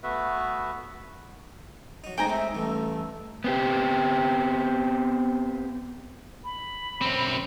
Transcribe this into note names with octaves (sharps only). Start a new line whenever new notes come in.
A3 B3 F#4 B4 E5
F#3 D#4
A2 G#3 C4 D#4 G5 G#5 A#5
D#4 E5
A1 G2 A3
B3 C4 G4
B5
F#2 C4